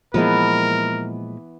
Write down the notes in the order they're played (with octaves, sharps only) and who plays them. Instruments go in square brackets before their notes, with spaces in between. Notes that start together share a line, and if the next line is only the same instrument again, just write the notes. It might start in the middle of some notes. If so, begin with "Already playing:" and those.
[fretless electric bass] A#2 F3 G#3 [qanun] E3 B3 [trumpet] A#4